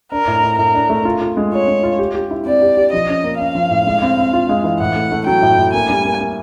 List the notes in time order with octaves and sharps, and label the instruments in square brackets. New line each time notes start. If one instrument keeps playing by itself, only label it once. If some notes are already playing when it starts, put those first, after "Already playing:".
[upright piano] D4 [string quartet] A#4
[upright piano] A2
A2
[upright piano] A2 [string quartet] A#4
[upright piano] D4
A3
F4
F4
G#3
[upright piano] F4 [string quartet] C#5
[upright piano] G#3
F4
G4
G4
E4
[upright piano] C4 [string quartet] D5
[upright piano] G4
G4
[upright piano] F3 [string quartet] D#5
[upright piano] C#4
A#3
[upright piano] C#4 [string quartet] F5
[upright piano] F3
A2
G#3
C4
C4
F4
G#3
E3
[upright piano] A2 [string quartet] F#5
[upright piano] A3
A3
[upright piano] F#3 [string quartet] G5
[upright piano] A2
A2
[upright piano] A#3 [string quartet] G#5
[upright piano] G3
A#3
A#3